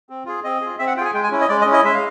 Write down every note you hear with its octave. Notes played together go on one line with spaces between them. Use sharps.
C4
F4 G#4
C4 D#5
F4 G#4
C4 E5
F#5
F4 G#4 G5 G#5
G#3 G5
G#5
C#4 E4
D#5
G#3 D5
D#5
C#4
E4 D#5
G#3 E5
F5